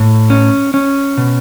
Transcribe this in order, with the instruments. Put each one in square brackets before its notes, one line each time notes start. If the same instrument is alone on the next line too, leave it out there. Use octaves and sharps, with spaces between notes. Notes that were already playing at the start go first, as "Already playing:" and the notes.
Already playing: [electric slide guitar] A2
C#4
C#4
B2